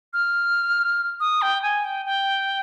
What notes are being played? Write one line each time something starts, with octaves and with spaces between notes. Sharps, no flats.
F6
D#6
G5
G#5
G5
G5